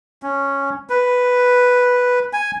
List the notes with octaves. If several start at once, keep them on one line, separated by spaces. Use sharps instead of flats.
C#4
B4
G#5